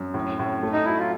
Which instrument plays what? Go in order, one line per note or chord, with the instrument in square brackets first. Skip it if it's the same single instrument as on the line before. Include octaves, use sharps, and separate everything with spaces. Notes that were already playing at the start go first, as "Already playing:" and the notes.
Already playing: [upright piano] F#2
A2
A2
A3
[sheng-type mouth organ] D#4
[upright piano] F#3 [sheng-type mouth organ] E4
[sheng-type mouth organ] F4